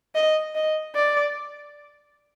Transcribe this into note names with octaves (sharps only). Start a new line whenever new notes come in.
D#5
D#5
D5